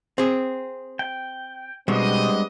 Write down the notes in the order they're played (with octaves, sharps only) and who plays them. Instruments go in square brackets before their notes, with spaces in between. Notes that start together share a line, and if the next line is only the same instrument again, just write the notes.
[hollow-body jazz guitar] C4 G#4
[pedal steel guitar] G5
[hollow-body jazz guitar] B2 [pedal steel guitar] G3 G#3 D4 [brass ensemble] B3 C4 D#5